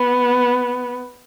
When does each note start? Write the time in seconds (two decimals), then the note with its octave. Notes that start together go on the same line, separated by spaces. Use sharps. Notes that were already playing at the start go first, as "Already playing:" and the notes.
Already playing: B3